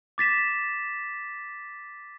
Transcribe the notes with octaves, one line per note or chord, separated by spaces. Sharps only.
D6 A6 B6 E7